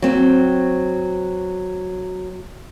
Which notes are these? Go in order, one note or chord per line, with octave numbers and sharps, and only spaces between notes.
F#3 C4